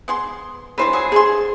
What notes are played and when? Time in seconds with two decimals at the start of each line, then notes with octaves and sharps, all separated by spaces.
0.08 B3 G#4 C6
0.78 D3 E3 G3 B4 C5
0.93 F#3 G#4
1.12 D3 G#4 G#5 C6